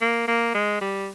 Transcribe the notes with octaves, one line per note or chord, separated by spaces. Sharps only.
A#3
A#3
G#3
G3